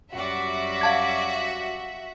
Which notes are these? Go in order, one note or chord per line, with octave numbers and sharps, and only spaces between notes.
F#2 G3 F#4 D5 E5
F5 A5 G#6